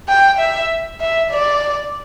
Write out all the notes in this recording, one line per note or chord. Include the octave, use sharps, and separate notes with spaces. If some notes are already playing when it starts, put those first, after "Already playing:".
G5
E5
E5
D5